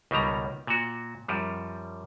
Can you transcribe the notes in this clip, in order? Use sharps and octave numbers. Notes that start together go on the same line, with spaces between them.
C#2 B2 D#3 G3 A#5
A#2 F#4
F#2 F3 G3